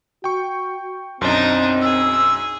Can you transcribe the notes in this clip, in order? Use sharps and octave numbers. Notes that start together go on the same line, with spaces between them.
F#4 G5 C#6
B1 F#2 C4 D4 D#4 C6
G#4 E6